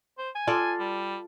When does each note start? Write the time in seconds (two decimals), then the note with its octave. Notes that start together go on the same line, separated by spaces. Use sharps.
0.18 C5
0.35 G#5
0.47 F4 A4 D5
0.80 G3